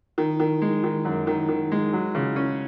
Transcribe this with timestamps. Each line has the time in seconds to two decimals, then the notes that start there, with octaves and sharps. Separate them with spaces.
0.18 D#3
0.40 D#3
0.62 G#3
0.84 D#3
1.05 F#2
1.27 D#3
1.49 D#3
1.72 G#3
1.93 F#3
2.15 C#3
2.36 C#4